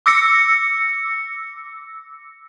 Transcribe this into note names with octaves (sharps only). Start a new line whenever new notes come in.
D6 E6 A#6 C#7